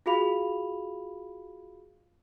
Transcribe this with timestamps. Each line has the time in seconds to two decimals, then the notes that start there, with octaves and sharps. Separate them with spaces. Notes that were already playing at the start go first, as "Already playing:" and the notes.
0.06 F4 F#4 G#4 F5 B5 F7